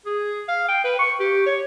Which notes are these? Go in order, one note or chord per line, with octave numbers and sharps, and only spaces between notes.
G#4
F5
G5
B4
C#6
G4
C#5